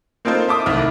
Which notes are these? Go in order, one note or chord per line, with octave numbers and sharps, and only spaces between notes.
A#3 C4 D#4 F4 A4 C5
E5 A5 D6 D#6
C2 D#3 A3 E4 F6